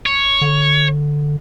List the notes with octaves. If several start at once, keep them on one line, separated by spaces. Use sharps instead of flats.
C#5
D3